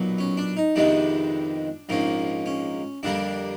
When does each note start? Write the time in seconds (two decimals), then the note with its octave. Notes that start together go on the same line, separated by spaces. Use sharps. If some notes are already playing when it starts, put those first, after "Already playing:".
Already playing: B1 A#2 F#3 B3
0.18 C#4
0.37 D4
0.57 D#4
0.76 F2 C3 D#3 G#3 B3 D4
1.89 A#1 G#2 F3 A#3 C#4
2.46 C#4
3.03 F2 D3 G3 A#3 D4